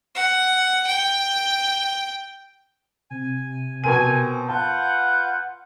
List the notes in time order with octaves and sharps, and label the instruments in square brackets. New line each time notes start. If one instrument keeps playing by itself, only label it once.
[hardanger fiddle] F#5
G5
[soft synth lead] C3 [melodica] G#5
[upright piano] B2 A#4 D#7 [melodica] C4 C5 [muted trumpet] G#5
[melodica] F4 B4 [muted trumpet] F#5 [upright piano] A5 [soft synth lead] G6